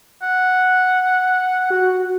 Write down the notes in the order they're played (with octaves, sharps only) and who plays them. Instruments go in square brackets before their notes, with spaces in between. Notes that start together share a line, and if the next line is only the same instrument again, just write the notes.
[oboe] F#5
[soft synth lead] F#4